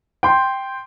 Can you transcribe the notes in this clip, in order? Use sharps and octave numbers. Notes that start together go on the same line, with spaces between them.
G5 C6